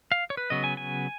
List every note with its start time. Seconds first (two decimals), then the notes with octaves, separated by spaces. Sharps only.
0.12 F5
0.30 C#5
0.37 B4
0.50 C#3 F#3 B3 D#5
0.64 G#5
0.77 G#5